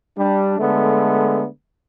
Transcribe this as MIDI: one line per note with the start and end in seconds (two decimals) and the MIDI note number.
0.18 0.58 55
0.18 0.58 62
0.59 1.46 50
0.59 1.46 56
0.59 1.46 57
0.59 1.46 59